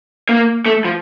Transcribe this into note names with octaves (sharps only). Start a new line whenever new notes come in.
A#3
A3
F3